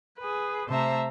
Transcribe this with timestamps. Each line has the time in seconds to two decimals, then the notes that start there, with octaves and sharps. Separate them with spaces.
0.19 G#4 B4
0.68 C3 A3 C5 E5 A5 A#5